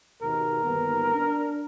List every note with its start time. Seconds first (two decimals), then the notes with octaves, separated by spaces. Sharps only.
0.22 G#1 D#2 B2 A#4
0.64 G1 D#2 B3
1.15 D4